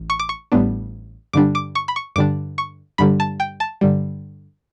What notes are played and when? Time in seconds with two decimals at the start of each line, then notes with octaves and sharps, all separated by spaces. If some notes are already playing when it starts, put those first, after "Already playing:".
Already playing: A1
0.10 C#6
0.19 D6
0.29 C#6
0.52 A1 A2 G3 B3 D4
1.33 G2 D3 G3 D4 D6
1.55 D6
1.75 C#6
1.88 B5
1.96 C#6
2.16 G2 D3 G3 D4 D6
2.58 C#6
2.98 G2 D3 G3 B5
3.20 A5
3.40 G5
3.60 A5
3.81 G2 D3 G3